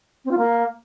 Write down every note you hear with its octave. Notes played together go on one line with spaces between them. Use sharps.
C4
F4
A#3